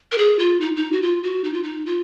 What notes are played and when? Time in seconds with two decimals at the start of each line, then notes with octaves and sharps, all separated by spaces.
0.12 A#4
0.18 G#4
0.39 F4
0.61 D#4
0.76 D#4
0.92 F#4
1.02 F4
1.23 F#4
1.44 D#4
1.53 F4
1.63 D#4
1.86 F4